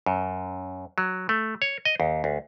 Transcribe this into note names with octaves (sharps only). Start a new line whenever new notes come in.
F#2
F#3
A3
C#5
D#5
D#2
D2